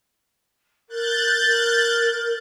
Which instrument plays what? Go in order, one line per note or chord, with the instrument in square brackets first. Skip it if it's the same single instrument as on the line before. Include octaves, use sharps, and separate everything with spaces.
[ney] A#4 [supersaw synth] F#6 G6 A6
[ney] A#4